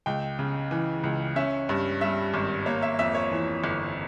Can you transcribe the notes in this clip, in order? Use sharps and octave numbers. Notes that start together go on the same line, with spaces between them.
C#2 G5
C#3
E3
C#2
C#4 E5
G2
G3 E5
G#1
A#3 C#5
E5
F2 E5
C#5
E3
G1